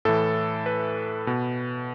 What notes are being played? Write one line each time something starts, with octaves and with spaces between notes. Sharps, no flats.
A2 E3 A4
B4
B2